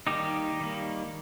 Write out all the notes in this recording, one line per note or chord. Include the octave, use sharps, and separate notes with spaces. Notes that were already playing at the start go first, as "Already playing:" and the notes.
D#3 G3 A#3 D#4 G4
D#3 G3 A#3